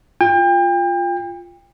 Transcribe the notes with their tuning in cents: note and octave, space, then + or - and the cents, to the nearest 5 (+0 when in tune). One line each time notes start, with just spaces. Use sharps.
F4 +0 G5 +35